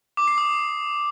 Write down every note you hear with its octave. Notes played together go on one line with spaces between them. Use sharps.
D6
C7
D#6